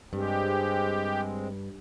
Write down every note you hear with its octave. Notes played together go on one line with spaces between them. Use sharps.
G2 G#3 C4 G4